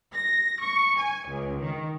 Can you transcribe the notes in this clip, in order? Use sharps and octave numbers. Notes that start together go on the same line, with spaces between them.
A#6
C#6
G#5
C#2
D#3